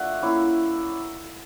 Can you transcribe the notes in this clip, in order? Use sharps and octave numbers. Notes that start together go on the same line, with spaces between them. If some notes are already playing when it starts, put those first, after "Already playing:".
Already playing: A3 D4 F4 E5 F#5
A#3 C#4 E4